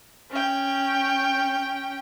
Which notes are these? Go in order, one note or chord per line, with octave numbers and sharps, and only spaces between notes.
C#4 G5